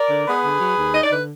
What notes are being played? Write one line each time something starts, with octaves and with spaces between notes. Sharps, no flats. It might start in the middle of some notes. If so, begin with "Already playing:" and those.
Already playing: A#4 D5
D3
B3 G#4 B4
D3
F#3
D#2
D#4 D#5
D5
D3 B4